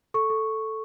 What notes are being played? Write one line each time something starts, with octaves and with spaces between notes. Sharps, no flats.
A4 C#6
A4